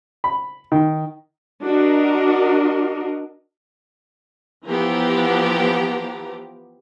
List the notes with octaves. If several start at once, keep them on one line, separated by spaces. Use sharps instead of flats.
B5
D#3
D4 F#4 A#4 D#5
E3 F3 B3 G4 A#5